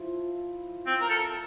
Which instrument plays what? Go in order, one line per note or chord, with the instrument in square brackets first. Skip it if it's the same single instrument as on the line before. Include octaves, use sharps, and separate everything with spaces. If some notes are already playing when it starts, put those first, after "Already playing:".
Already playing: [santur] F3 E4
[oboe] C4
A#4
A4